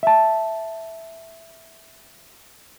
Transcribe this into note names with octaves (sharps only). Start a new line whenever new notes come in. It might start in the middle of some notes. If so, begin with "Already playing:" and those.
E5 A5